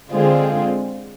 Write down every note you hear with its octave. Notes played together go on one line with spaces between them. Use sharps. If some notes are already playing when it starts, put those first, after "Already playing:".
D3 G#3 C4 F4 G#4